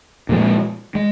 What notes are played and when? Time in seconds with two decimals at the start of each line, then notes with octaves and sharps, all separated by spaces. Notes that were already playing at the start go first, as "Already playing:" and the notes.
0.29 A#2 F3 G#3
0.95 G#3